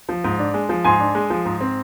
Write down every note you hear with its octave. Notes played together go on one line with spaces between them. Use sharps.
F3
G#2
D4
G#3
F3
G#2 G#5 C6
D4
G#3
F3
G#2
C4